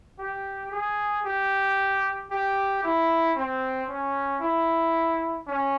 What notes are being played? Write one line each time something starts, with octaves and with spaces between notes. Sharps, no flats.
G4
G#4
G4
G4
E4
C4
C#4
E4
C#4